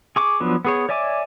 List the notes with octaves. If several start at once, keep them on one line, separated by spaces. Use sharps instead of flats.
G#4 C#6 D6
F3 F#3 B3 D4
B3 G#4 C#5
C#5 D5 E5 G#5 D6